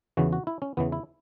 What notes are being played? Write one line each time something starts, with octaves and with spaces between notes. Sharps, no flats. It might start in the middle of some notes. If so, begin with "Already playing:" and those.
E2 C#3 E3 F#4
F#4
E4
C#4
E2 C#3 E3 B3
E4